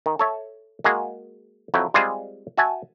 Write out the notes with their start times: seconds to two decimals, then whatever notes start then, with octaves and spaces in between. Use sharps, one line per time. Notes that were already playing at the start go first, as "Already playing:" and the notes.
0.06 D#3
0.19 A4 C#5 E5
0.84 G#3 A#3 F#4 G#4
1.74 F2 F#3 E4 G5
1.94 G3 G#3 C4 F4 G#4 C5
2.57 F#4 E5 G#5 A5